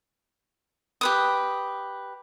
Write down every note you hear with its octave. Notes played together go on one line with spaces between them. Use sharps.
G4 B4 D#6